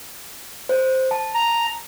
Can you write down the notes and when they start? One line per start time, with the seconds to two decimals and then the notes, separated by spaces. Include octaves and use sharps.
0.69 C5
1.11 A5
1.35 A#5